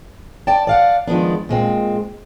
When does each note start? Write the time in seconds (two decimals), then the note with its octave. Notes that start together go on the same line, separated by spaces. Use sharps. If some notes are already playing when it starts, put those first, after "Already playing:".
0.47 D5 G5 A5
0.67 D5 F5 F#5
1.08 D#3 F3 G#3 B3 D4
1.49 A#2 G#3 C4